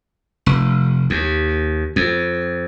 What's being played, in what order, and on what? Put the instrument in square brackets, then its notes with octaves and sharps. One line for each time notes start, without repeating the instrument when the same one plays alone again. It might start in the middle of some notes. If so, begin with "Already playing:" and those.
[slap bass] F1
D#2
F2